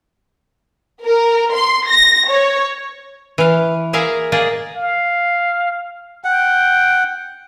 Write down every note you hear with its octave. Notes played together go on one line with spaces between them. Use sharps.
A#4
C6
A#6
C#5
E3 F5
A#3 G#4 A#4 E5 F5
A#3 G#4 D5 D#5
F5
F#5 G5